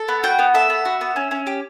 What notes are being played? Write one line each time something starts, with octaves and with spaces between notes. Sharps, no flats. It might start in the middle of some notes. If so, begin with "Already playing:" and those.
Already playing: A4
B3
F#4 G5
B3
A4 E5
B3
F#4
B3
C#4
C#4
G4